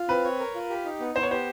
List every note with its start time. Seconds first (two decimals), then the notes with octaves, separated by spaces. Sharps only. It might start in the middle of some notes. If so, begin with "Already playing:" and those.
Already playing: F4
0.08 C4 B4
0.24 C#5
0.39 A#4
0.55 F4
0.70 G4
0.85 D#4
1.00 B3
1.15 B3 C5
1.23 C#5
1.31 G4 C5